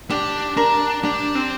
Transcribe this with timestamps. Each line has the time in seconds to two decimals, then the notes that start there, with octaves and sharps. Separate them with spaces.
0.10 D4 G4
0.57 D4 A#4
1.03 D4 G4
1.35 C4